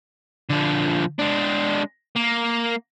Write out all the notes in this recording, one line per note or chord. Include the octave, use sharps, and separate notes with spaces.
D3 F3
G#3 D4
A#3